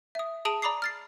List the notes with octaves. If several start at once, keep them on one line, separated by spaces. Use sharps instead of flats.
E5 D#6
G#4 A5 D#6 D7 D#7 F#7
D5 A#5 B5 D6 D#6 C7
F6 A6 C7